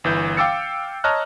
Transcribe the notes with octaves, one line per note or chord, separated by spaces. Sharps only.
G1 E3 G6
F5 G5 D6 E6 A6 C#7
C#5 D#5 A5 A#5 F6 F#6